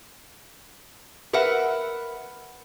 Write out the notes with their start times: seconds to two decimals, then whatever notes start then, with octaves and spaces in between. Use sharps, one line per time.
1.33 A#4 B4 E5 F#5